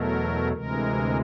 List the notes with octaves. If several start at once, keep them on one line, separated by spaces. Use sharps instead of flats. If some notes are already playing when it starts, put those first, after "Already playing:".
Already playing: E2 B2 F#3 A3 A#4
D2 C3 E3 G#3 A#4